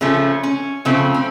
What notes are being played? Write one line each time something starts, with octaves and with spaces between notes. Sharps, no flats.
C#3 F3 A3 C#4
C#4
C#3 F3 A3 C4
C4